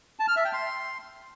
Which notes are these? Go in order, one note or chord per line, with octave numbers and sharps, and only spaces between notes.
A5
F6
E5
G5
C6